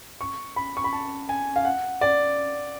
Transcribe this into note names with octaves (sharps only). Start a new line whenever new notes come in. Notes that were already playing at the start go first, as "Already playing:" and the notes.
C#6
B5
C#6
B5
A5
G#5
F5
F#5
D5